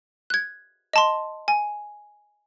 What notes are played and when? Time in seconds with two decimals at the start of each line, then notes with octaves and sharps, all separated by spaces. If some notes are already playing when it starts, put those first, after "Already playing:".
0.30 F#6 G#6
0.93 D#5 A5 C6
1.48 G#5